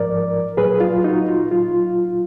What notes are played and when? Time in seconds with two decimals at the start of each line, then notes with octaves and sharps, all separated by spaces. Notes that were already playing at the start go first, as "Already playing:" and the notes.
Already playing: G#2 F3 A#4 D5
0.57 A#2 F#3 G#4 B4
0.80 F4
1.04 D#4 F#4
1.28 F4
1.51 A#2 F#3 F4